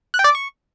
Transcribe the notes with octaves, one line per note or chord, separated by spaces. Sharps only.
F#6
G5
D5
D6
C#6